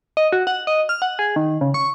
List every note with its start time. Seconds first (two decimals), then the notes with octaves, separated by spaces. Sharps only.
0.17 D#5
0.32 F#4
0.47 F#5
0.67 D#5
0.89 F6
1.02 F#5
1.19 G#4
1.36 D#3
1.61 C#3
1.74 C#6